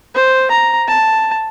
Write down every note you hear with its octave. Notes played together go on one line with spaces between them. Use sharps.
C5
A#5
A5